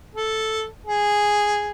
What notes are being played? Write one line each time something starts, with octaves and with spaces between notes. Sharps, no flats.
A4
G#4